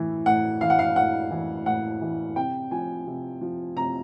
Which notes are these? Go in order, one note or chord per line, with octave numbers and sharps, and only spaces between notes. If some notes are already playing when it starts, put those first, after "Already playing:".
Already playing: A2 E3
A2 F#5
E3 F5
F#5
F5
A2 F#5
E3
A2 F#5
E3
C3 G5
F3 G#5
C3
F3
C3 A#5